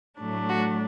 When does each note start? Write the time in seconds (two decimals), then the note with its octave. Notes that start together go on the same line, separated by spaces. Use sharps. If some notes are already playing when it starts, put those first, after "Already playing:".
0.19 A2 F#3 A3 D4
0.49 F#4